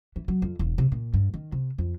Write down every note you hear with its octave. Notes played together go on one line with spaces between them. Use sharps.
E3
F#3
F2
E1
C3
A#2
G2
D#3
C3
F2